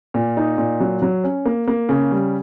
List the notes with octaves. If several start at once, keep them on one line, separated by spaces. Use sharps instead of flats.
A#2
D#4
A#2
F#3
F#3
C#4
A#3
A#3
C#3
G3